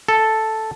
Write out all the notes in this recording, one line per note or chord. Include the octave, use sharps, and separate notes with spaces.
A4